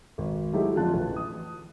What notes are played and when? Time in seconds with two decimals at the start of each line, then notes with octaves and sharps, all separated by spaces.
0.18 G#1
0.53 F#3 G#3 A3 D#4 E4 G4
0.75 F2 D3 F#3 F4 A5 F#6
0.94 A1
1.16 D#6